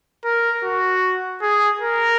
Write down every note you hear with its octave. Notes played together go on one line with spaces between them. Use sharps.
A#4
F#4
G#4
A#4